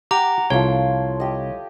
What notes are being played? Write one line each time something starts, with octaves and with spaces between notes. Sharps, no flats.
G4 F#5 A#5 D6
C2 F3 A3 C#5
G4 D#5